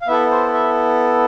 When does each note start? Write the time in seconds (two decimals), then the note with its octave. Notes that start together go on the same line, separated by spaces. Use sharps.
0.02 F5
0.07 B3 E4 A4 E5
0.31 C5
0.54 E5